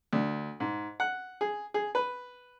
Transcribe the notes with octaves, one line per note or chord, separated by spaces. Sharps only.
D2
G#2
F#5
G#4
G#4
B4